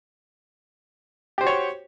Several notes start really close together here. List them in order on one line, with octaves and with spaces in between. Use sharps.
G4 C5 F#4 C#5